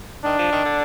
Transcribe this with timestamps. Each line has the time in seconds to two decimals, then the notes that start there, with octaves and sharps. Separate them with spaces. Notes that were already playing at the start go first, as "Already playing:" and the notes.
0.25 D#3 D4
0.39 F3
0.52 D#3
0.65 D3